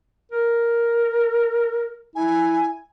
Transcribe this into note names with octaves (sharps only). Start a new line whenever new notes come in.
A#4
E4 G#5